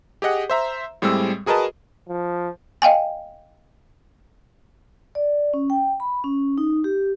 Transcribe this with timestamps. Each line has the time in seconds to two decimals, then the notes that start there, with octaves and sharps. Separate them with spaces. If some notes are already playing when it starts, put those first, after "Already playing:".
0.22 G4 G#4 D#5 F#5
0.50 C5 E5 A#5
1.02 A2 G3 G#3 C4 E6
1.46 F#4 G#4 A#4 B4 D#5 A5
2.08 F3
2.82 D#5 F5 G5 G#5
5.15 D5
5.54 C#4
5.70 G5
6.00 B5
6.24 C#4
6.58 D#4
6.84 G4